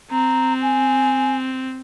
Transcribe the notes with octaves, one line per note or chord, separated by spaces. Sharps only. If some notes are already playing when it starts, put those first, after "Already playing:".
C4 A#5
G#5